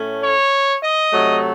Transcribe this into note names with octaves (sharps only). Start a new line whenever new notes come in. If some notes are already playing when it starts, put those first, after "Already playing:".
Already playing: A2 A3 C#4
C#5
D#5
C3 F#3 A3